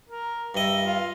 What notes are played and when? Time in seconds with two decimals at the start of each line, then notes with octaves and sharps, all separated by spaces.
0.09 A#4
0.55 G2 D#5 E5
0.84 F4